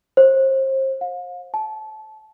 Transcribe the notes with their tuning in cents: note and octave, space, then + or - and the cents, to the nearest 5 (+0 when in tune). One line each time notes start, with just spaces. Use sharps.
C5 +35
F5 +40
A5 -25